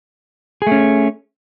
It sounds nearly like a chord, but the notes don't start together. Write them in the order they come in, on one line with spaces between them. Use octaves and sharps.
G#4 A3 C#4